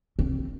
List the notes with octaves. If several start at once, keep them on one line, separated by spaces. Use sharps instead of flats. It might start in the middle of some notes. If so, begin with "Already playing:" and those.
C4